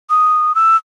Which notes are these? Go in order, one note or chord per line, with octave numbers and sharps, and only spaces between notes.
D#6
E6